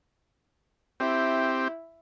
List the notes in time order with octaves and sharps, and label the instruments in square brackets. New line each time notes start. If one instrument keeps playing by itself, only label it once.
[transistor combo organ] C4 G4 [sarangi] E4